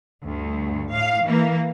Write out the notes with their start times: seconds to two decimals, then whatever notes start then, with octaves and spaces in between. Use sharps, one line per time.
0.23 D2 G2
0.90 A2 F5
1.23 E3 A#3